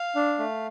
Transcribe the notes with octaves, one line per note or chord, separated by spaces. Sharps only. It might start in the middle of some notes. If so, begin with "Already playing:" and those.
Already playing: F5
D4
A3